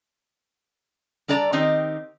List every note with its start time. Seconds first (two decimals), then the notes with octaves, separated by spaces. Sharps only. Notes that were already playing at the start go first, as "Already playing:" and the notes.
1.28 G3 D4 A4 D5 A#5
1.52 D#3 C4 D#4 G4